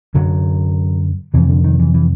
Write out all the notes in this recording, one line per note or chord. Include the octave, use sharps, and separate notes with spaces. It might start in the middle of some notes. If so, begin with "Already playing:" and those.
F#2 D3 F#3
F2 C3 E3
D3
D#3
E3
E3